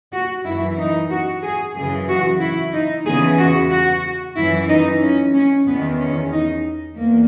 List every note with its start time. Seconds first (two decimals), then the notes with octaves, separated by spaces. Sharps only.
0.13 F#4
0.45 F#2 E3 E4
0.78 D#4
1.10 F#4
1.42 G#4
1.75 F#2 C#3 E3 G#4
2.08 F#4
2.40 E4
2.73 D#4
3.06 E2 C#3 E3 G#4
3.39 F#4
3.71 F#4
4.36 F#2 E3 E4
4.68 D#4
5.01 C#4
5.33 C#4
5.67 E2 D#3 B3
5.99 C#4
6.32 D#4
6.97 E2 A#3